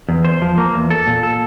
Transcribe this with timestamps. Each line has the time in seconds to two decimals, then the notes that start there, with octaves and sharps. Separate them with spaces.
0.09 E2
0.25 C5
0.42 F3
0.58 A#3
0.74 E2
0.90 A4
1.07 A#2
1.23 A4